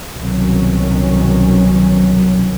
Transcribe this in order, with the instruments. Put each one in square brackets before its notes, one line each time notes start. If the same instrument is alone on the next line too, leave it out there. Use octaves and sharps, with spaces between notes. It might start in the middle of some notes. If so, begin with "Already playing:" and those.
[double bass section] C2 B2 D#3 F#3 C#4